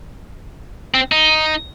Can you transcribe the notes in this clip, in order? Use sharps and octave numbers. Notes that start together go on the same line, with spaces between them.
C4
D#4